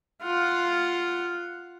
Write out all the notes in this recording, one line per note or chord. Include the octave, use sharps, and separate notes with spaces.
F4 F#5